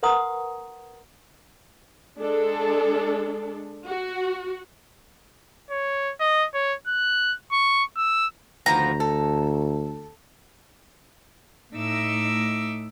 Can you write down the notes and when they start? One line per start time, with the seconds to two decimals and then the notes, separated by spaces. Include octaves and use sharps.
0.03 A#4 B4 F#5 A#5 C6 D#6
2.18 G#3 D4 A4
3.86 F#4
5.70 C#5
6.21 D#5
6.54 C#5
6.87 F#6
7.52 C#6
7.97 E6
8.66 D2 D#3 F3 B3 A#5
9.00 A4
11.75 A2 A3 D#4 E5 D6 E6